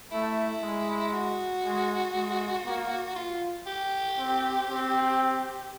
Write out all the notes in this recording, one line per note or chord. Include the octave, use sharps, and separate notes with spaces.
A3 E4
G#3
F#4
G#3
G#3
A#3
F4
G4
C4
C4